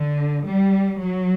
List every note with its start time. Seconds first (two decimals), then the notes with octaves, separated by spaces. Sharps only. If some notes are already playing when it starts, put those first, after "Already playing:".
Already playing: D3
0.46 G3
1.01 F#3